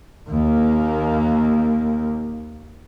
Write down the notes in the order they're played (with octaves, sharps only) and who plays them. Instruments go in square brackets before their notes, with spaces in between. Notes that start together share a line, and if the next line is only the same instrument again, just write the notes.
[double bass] D#2 A#3